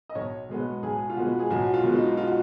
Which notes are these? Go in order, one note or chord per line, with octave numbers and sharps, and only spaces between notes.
D#5
B1 C#5
B2 G#3 B3
B1 G#4
F4
B2 G#3 B3 F#4
G#4
B1 F#4
F4
B2 G#3 B3
D#4
F4
F#4